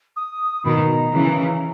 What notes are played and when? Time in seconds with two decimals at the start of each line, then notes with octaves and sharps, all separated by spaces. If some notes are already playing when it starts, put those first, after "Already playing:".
0.16 D#6
0.65 B2 D#3 A#5 B5
1.13 C#3 E3